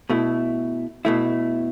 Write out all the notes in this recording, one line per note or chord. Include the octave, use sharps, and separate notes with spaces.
B2 A3 E4
B2 A3 E4